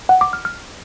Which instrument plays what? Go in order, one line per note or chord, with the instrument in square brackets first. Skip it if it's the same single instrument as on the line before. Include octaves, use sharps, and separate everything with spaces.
[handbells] F#5
D6
F6
F6